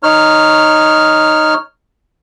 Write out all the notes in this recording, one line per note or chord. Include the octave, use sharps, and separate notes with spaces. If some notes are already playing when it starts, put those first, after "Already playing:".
D#4 C#5 F6